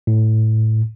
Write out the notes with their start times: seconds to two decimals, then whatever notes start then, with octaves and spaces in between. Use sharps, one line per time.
0.07 A2